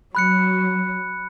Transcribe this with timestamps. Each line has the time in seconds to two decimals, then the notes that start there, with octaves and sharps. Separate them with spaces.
0.15 F#3 B5 F#6 C#7